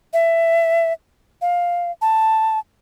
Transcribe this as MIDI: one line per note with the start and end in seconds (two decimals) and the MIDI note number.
0.13 0.93 76
1.42 1.91 77
2.02 2.59 81